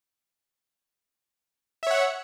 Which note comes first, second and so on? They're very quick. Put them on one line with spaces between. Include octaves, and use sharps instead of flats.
E5 C#5 F#5